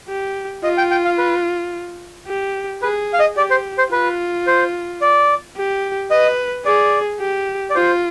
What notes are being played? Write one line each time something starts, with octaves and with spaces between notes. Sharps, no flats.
G4
F4 D#5
G5
G5
F5
B4
G4
G#4 B4
F5
D#5
G4 D5
C5
C5
F4 B4
C5
D5
G4
B4 D#5
G#4 D5
G4
D5
F4 C5